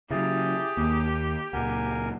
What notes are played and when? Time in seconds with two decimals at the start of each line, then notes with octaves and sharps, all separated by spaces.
0.11 C#3 F#3 E4 G4 G#4 E5 A6
0.77 D#2 A#3
1.53 C#2 A#2 A#4 F#5 G#5